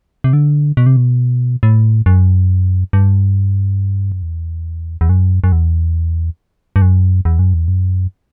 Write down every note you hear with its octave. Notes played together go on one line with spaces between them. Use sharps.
C3
D3
B2
C3
B2
A2
F#2
G2
F#2
E2
E2
F#2
F#2
E2
G2
F#2
E2
F#2
E2
F#2